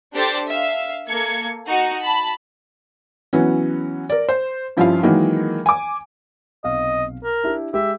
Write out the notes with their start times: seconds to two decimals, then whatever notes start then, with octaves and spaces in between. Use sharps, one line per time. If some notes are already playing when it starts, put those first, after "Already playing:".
0.14 D4 G4 A4 C5 A6
0.48 E5 F5
1.08 A#3 A4 G#6 C#7
1.66 D#4 F#4
2.03 A5 B5
3.33 E3 F#3 B3 C#4
4.09 A#4 D5
4.29 C5
4.77 G2 F3 C#4 E4 F4 F5
5.03 D#3 E3 F#3 G#3 A#3
5.66 G#5 D6
6.64 B1 C3 D#5 F5
7.24 A#4
7.44 D4 E4 G4
7.74 G#3 G4 E5